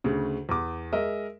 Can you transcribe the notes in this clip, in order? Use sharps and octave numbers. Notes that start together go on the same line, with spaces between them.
D2 C#3
E2 D6
G#3 A#4 D#5 E5